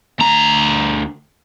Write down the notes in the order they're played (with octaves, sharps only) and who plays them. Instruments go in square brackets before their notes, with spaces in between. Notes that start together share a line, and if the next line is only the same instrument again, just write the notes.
[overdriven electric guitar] D2 A#5